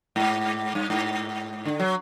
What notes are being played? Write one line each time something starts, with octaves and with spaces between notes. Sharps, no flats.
G#2
G2
G#2
D3
F#3